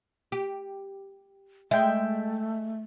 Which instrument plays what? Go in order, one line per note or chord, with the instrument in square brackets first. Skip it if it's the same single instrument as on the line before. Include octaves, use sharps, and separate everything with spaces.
[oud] G4
[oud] G#3 [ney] A3 [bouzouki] E5 G5